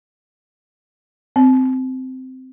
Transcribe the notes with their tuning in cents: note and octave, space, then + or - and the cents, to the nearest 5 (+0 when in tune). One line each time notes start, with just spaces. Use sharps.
C4 -15